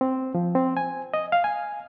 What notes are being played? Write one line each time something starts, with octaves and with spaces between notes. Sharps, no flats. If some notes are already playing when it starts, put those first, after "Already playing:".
C4
F3
C4
G#5
D#5
F5
G#5